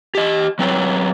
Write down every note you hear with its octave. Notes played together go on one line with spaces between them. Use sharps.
G4 D#5
F#3 C4 B4 C#5